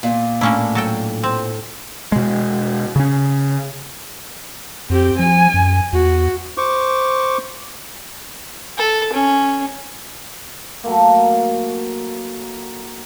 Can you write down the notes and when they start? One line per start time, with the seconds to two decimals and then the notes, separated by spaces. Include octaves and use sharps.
0.03 A#2
0.41 A2 A#3 C#4 D4 E4
0.75 F#3 A4 G5
1.23 C4
2.12 B2 G#3
2.96 C#3 C#4
4.90 F2 C4 G4
5.19 F3 G#5
5.54 F#2
5.93 E2 F#4
6.58 C5 C#6 D6
8.78 A4
9.13 C#4
10.84 F#3 A3 A#3